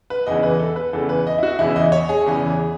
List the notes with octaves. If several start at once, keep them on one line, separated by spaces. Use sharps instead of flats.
B4
E2 C#3 E3 D#5
B4
A4
B4
E2 C#3 E3 A4
B4
D#5
E4
F#4
E2 C#3 E3 E4
D#5
C#5
G#4
E2 C#3 E3